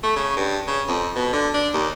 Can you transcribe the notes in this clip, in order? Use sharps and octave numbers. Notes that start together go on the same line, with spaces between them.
A3
C#3
G2
C#3
F2
B2
D3
D4
D#2